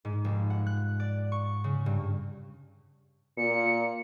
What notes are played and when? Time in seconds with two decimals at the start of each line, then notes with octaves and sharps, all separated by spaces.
0.05 G#2
0.25 F1
0.50 F#5
0.66 F#6
1.00 D5
1.32 C#6
1.64 C#3
1.86 G2
3.37 A#2 C#7